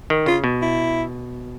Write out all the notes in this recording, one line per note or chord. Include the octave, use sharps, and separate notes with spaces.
D#3
C#3 F4
B2
E4